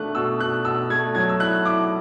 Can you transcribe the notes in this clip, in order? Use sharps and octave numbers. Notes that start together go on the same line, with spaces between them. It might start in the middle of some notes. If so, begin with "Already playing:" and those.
Already playing: B2 A3 D4 F#6
B2 E6
B2 F#6
B2 E6
A3 G#6
F#3 G#6
E6
E4 F#6
E4 D6